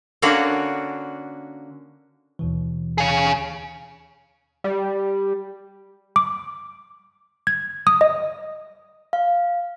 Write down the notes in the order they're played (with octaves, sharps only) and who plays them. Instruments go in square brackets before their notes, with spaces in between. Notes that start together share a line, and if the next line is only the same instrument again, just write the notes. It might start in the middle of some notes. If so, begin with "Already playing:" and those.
[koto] D3 A#3 C#4 D4 F#4
[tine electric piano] D#2 B2 E3
[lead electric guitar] G#4 F5
[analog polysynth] G3
[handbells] D6
G#6
D#6
D#5
[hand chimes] F5